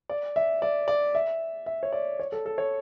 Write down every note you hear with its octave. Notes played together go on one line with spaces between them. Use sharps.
D5
E5
D5
D5
E5
E5
C#5
D5
C#5
A4
A4
C#5